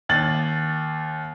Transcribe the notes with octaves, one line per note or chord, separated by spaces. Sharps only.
D#2 A6 F#7